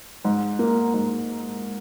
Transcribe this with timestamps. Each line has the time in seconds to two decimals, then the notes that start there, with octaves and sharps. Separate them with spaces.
0.25 G#2
0.59 A#3
0.94 G#2